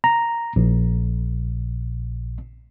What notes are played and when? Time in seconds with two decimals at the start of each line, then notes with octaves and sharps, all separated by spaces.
0.04 A#5
0.56 A#1